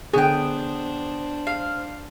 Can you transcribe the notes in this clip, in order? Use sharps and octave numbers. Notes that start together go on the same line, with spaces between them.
D3 B3 D4 G#4 C5 G5
F5